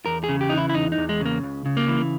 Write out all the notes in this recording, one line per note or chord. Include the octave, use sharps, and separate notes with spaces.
E2 A#4
G#4
C#3
G4
E3 D#4
E4
E4
E2 D#4
D#4
E2
G#3
C#3 A#3
C#2
C#3
A#3
E3